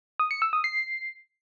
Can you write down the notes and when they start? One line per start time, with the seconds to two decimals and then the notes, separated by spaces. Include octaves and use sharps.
0.20 D#6
0.31 C#7
0.42 E6
0.53 D#6
0.64 C7